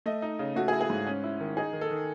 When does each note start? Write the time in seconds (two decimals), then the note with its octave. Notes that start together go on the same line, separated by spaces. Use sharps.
0.06 A3 D#5
0.22 D#4
0.39 C#3
0.56 A3 F#4
0.68 G#4
0.73 E4
0.81 G#4
0.90 G#2
1.07 C#4
1.24 E4
1.40 D#3
1.57 D#4 G#4
1.73 D#3
1.81 A4
1.90 D#3